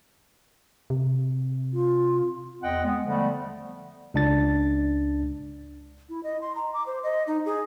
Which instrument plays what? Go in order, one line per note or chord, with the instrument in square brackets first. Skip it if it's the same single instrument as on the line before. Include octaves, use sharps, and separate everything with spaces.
[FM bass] C3
[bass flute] F4
[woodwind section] E2 C4 D#5 F#5 G5
G#3 B3
D3 F3 G3 A3 B3
[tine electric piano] C#2 D4 A6
[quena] E4
D#5
C6
A#5
D6
C5
D#5
D#4
G#4